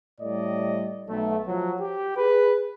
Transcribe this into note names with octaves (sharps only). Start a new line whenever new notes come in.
A2 G3 D5 D#5
B1 A3
F3 F#3
G4
G#4 B4